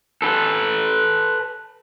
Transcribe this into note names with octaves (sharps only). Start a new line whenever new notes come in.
A4 B4